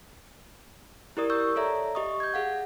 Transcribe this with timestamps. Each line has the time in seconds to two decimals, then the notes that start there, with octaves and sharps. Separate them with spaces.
1.17 E4 G4 A#4 D5 D#6
1.30 C#6 E6 G6
1.56 A4 C#5 D5 E5 A#5
1.95 G4 D#5 C#6 D#6
2.20 G6 G#6
2.34 G#4 F5 F#5